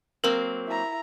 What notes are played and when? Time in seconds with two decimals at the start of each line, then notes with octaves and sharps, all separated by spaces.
0.24 F#3 A#3 C4 A#4
0.68 E4 A#5